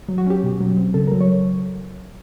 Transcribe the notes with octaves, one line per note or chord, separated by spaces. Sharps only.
F#3
F#4
C#4 G4
B2
F#3
C4
C#3 A4
A#4
F#3
C#5